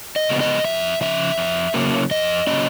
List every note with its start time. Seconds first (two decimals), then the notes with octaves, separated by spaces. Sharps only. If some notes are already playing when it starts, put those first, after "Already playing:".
0.16 D#5
0.29 C#3 F3 G#3 B3
0.41 D#5
0.64 F2 E5
1.01 C#3 F3 E5
1.38 F2
1.74 C#3 F#3 A#3 C#4
2.11 F2 D#5
2.47 C#3 F#3 A#3 C#4 D#5